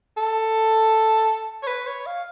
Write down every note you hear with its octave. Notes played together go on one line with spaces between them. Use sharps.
A4
C#5
B4
C#5
F5